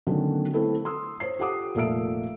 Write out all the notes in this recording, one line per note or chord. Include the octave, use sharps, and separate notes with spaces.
D3 D#3 F#3 A3 B3 C#4
A3 C4 E4 A4 B4
C6 D#6 E6
C5 C#5 C7
F4 G4 A4 F#5 D6 D#6
F1 A#2 A4 E5 E6 D7